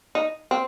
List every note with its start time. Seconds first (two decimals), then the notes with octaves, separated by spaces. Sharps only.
0.15 D#4
0.51 C4